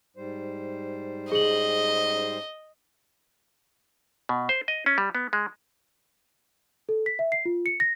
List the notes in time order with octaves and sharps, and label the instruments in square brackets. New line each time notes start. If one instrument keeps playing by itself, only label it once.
[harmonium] G#2 G3 C5
[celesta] G#4 F#7 [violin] D#5
[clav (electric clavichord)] B2
C5
D#5
C#4
G3
B3
G#3
[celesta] A4
B6
E5
C7
F4
C#7
A#6